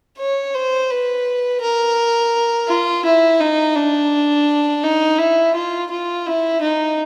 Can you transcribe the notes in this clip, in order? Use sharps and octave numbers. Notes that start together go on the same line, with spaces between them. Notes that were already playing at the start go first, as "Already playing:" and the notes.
C#5
C5
B4
A#4
F4
E4
D#4
D4
D#4
E4
F4
F4
E4
D#4